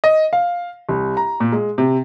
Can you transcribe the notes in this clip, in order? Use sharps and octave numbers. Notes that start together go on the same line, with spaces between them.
D#5
F5
C2
A#5
A#2
G#3
C3